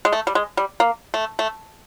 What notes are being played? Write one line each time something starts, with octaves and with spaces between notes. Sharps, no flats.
G#3
A3
G3
G#3
G3
A#3
A3
A3